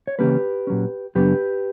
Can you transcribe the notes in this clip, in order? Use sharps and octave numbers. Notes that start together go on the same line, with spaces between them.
C#5
C#3 E3 G3 A#3 C#4 G4 B4
A#2 F#3 C#4
F#2 C#3 F#3 B3 D4 G4 B4